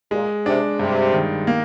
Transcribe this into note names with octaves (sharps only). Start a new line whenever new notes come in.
A#2 G#3
C3 D4
G2 C3
D#3
A#3